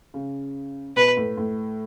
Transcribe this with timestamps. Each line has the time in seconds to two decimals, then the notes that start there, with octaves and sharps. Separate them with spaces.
0.14 C#3
0.96 B2 B4
1.17 A2
1.37 A2